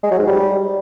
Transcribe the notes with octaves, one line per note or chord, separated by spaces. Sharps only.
G#3
F#3
G#2
G3